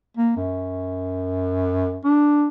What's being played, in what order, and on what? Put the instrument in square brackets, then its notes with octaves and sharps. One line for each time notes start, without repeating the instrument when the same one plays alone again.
[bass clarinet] A#3
F#2
D4